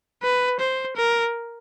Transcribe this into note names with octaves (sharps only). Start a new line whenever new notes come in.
B4
C5
A#4